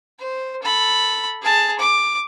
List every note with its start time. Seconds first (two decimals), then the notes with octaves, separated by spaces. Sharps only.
0.19 C5
0.62 A4 B5
1.42 G#4 A5
1.79 D6